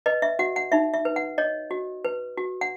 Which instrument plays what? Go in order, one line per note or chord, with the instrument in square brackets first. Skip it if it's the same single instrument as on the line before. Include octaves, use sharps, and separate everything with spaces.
[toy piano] B4 D#5
E5
F#4 F#5
F#5
D#4 E5
E5
B4
F#5
C#5 D#5
F#4
B4
F#4
F#5